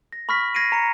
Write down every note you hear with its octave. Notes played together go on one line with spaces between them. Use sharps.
A#6
B5 C#6 F6 A#6 B6
G#6 A#6 C7 D7 D#7
A#5 A#6 C#7